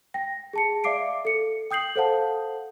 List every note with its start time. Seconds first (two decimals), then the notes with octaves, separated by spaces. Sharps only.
0.14 G5 A#6
0.53 G#4 A5 C#7
0.84 D5 E5 F5 D6 C7 D7
1.25 A4 C#7
1.71 G5 D#6 G6 C7 F#7
1.96 A4 C5 F5 F#5 A5